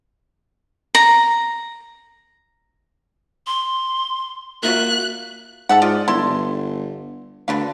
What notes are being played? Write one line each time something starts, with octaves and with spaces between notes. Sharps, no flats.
A#5
C6
A#3 F4 F#4 E5 F#6
G#2 A4 E5 F#5
F4 D5 D#5
G1 D3 E4 C6
G1
D2 D3 B4 F5